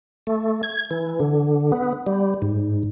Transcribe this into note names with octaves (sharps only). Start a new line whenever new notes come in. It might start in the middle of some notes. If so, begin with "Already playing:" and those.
A3
G#6
E3
D3
B3
G3
G#2